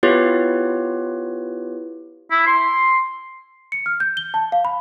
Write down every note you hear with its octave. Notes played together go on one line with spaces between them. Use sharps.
B3 E4 F4 G4 B4 C#5
E4
C6
C#7
F6
G6
G7
A5
F5
B5